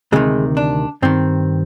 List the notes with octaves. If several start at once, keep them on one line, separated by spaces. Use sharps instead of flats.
D2 C3 D#3 G#3
D4
G2 D#3 C4